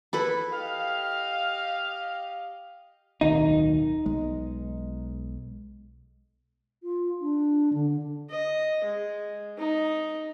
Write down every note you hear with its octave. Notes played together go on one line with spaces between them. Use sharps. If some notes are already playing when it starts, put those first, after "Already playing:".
E4 A4 B4
G4 D#5 F5
D1 B1 D#3 D#4
B1 G#3
F4
D4
D3
D#5
G#3
D#4